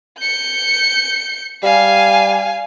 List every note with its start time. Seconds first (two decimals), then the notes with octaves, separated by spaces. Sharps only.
0.20 G6 C#7
1.63 G3 F5 G#5